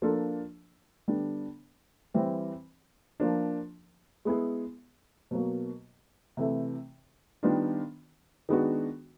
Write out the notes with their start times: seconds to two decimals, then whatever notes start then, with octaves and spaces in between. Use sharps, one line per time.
0.02 F3 A#3 D4 F4 A4
1.08 D3 G3 B3 D4
2.14 E3 G3 C4
3.20 F3 A#3 D4
4.25 G#3 B3 E4 G#4
5.31 B2 F#3 A#3
6.37 C3 E3 A3
7.43 D#3 G3 B3 D4 F4
8.49 D#3 G#3 B3 D4 F#4